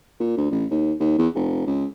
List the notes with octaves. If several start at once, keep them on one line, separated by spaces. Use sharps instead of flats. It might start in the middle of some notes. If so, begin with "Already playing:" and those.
A#2
D2
A1
D#2
D#2
E2
F1
C#2